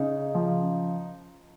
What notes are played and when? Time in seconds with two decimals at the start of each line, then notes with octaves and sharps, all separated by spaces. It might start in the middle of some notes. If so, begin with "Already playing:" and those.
Already playing: C#3 D#4
0.35 F3